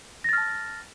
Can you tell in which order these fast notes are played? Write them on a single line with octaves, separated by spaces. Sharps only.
A#6 A6 F6 A5